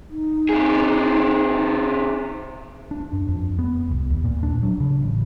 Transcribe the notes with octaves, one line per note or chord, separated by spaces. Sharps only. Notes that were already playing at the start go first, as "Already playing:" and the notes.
D#4
C3 G#4
D4
F#2
F2
B3
C2
D#2
A#2
D4
F#3
C#3
A1